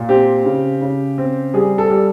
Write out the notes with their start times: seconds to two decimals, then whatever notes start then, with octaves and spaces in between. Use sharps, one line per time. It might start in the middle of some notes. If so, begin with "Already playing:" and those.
Already playing: A#2
0.09 C4 G4
0.45 C#3
0.82 C#3
1.18 C4
1.54 G3 G#4
1.78 A4
1.90 G3